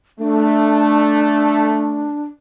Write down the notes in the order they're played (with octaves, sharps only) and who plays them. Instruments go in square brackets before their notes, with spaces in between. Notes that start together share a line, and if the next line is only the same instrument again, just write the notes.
[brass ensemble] A3 [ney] D4